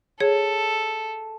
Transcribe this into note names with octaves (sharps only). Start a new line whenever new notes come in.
G#4 A4 C#5